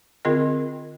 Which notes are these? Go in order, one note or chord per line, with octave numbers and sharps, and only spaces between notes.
D3 C4 F4 G#4 A#4 D#5